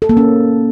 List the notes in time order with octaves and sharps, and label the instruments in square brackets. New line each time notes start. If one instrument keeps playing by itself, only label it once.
[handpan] A4
A#3
C#4